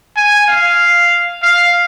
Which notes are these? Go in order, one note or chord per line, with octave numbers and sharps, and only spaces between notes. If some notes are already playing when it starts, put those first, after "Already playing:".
G#5
F5
F5